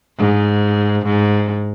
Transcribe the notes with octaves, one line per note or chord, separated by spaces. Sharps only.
G#2
G#2